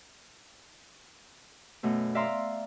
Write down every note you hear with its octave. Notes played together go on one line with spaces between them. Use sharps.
F#2 B2 A3
D5 E5 F5 A#5 C6